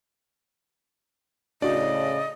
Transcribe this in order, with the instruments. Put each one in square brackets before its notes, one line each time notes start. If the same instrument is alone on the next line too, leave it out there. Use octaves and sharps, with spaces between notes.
[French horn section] A2 C#3 [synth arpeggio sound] D4 F#4 [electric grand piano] D5 [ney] D#5